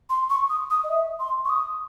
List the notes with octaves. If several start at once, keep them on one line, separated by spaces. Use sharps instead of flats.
C6
C#6
D#6
D#6
D#5
E5
C6
C#6
D#6